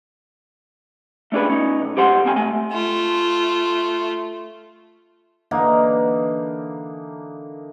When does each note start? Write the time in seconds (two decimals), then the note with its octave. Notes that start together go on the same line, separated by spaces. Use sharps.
1.32 A3 C#4 D4 G#4 B4
1.50 C#4 D#4
1.82 B1
1.96 G2 G4 C5 F#5 C6
2.25 C2 C4 G#5
2.36 A3 G#5
2.72 A3 F4
5.51 D3 E3 A#3 D#4